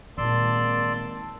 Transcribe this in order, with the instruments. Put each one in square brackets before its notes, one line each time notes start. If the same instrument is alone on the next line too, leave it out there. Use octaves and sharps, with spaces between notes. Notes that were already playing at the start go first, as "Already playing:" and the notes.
[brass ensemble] G#1 A#3 A5 [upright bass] A#2 D4 [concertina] D5 C6 E6